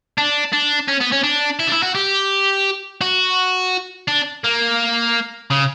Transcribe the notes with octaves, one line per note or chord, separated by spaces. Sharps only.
D4
D4
C#4
B3
C#4
D4
E4
D4
E4
F#4
G4
F#4
D4
A#3
C#3